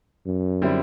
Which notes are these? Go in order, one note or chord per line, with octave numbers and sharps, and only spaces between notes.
F#2
D3 G3 C4 E4